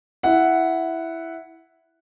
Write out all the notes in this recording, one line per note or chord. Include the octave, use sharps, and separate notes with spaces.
E4 F#5